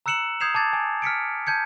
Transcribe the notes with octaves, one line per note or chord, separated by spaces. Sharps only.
A#5 E6 F#6 C#7 E7 F#7
D#6 G6 G#6 C7 E7 F7
A5 D6 G#6 A6
G#5
F6 B6 C#7 D7
A5 G6 G#6 C#7